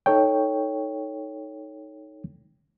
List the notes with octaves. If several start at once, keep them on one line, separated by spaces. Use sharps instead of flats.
D#4 A4 C#5 G5